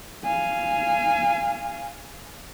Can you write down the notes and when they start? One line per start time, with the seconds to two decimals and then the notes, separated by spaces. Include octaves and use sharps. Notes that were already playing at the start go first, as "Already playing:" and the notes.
0.24 F5 G#5